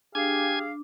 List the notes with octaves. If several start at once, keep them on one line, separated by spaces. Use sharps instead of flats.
D4 G4 G#4 F5 G#5 G#6